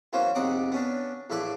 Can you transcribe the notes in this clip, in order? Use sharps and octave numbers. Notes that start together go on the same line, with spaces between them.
E3 F#3 A#3 C#4 C5
A#1 F2 C3 D#4 F#5 D6
B3 C#4 D4
A#1 A2 E4 A4 B4 D6